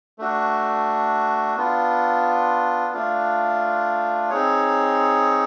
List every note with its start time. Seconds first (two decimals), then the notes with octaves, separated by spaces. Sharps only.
0.18 A3 D4 F#4
1.57 B3 D4 F4
2.93 A3 D4 F4
4.30 C4 D#4 G#4 C#5